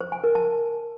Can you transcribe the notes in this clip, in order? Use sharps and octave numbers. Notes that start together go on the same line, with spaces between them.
C5
G#5
A#4
A5